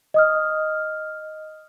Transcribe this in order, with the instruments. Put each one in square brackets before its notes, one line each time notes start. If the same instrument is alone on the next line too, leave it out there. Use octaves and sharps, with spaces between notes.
[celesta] D#5 D#6 F6